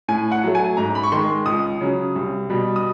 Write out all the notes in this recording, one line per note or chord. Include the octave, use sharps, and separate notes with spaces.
A2 G#5
F#5
F#3 A3
G#5
G#2 A#5
B5
C#6
D#3 G#3 C6
C#2 D#6
C#3 F#3
C2
B2 G3
D#6